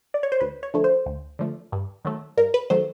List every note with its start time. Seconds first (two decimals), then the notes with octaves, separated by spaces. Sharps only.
0.14 D5
0.23 C#5
0.32 C5
0.41 D2 B4
0.63 C#5
0.74 D3 F3 A3
0.84 C5
1.06 D2
1.39 D3 F3 A3
1.72 G2
2.05 D#3 F#3 A3
2.37 G2 A#4
2.54 B4
2.70 D#3 F#3 A3 C5